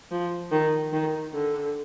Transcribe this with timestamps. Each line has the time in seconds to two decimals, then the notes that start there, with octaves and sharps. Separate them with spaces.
0.11 F3
0.52 D#3
0.93 D#3
1.33 D3